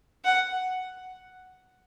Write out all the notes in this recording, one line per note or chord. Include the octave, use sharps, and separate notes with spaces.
F#5